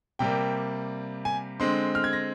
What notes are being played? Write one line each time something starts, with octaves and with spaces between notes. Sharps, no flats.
C3 G3 A#3 G5
G#5
D3 G#3 C4 C6
F6
G#6
A#6